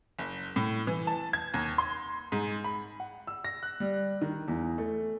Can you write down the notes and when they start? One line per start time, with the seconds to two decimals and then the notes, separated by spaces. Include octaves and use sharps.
0.19 F#1
0.56 A2
0.87 E3
1.07 A5
1.33 G#6
1.54 D#2
1.78 C6
2.32 G#2
2.64 B5
3.00 F#5
3.27 E6
3.45 A#6
3.63 F#6
3.80 G3
4.22 D#3
4.48 E2
4.78 A3